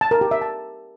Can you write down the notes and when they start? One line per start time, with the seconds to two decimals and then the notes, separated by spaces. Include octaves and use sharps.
0.01 A5
0.11 A#4
0.21 G4
0.31 E5
0.41 A5